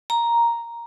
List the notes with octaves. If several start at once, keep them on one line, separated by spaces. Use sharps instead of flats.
A#5